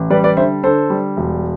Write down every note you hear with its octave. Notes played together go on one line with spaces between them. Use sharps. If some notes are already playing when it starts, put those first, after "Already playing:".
Already playing: A1
G3 B4 D5
B4 D5
D3 C5 E5
D3 A4 C5
G3
E1